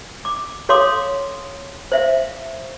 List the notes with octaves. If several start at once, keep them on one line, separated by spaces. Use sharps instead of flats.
D6
A4 C#5 F5 C6 D6 D#6
C5 E5 F5